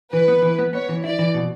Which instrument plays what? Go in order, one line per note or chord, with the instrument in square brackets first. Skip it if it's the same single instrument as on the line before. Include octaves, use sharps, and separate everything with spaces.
[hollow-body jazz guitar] E3 [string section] B4
[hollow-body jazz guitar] B3
E3
B3
[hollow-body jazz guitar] B3 [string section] C#5
[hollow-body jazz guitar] E3
[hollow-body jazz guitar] E4 [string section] D5
[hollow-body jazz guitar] E3
B2